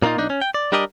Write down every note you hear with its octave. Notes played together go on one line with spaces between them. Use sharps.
A#2 A#3 D4 D#4 F4
B1 D4 D#4
C#4
G5
D5
G3 D4 G4 A#4 D5 D#5